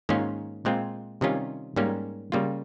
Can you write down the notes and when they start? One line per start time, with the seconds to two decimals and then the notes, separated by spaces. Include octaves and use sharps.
0.09 G#2 D#3 A#3 C#4 F4
0.65 A#2 G#3 C4 F4
1.21 C3 D#3 G3 C#4 F4
1.76 G#2 G3 A#3 C#4
2.32 C#3 G3 A#3 F4